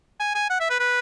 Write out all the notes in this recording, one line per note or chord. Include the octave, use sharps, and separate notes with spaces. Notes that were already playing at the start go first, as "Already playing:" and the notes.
G#5
G#5
F#5
E5
B4
B4